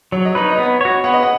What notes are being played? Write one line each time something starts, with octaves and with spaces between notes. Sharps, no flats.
F#3 C#5
D#5
D#4 B4 C#5
D#5
B3 C#5
F#4 C#5
B3 F#5
D#5
F#5